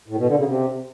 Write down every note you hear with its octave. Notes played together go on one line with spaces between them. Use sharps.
A2
B2
D3
C#3
C3